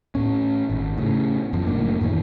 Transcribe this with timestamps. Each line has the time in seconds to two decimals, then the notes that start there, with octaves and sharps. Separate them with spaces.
0.15 A2 C#4
0.70 G#1
0.98 A2 C#3
1.53 F#2 F3
1.66 F#1 A2 A#3 D4
2.01 F#2 A#2 D#3 E3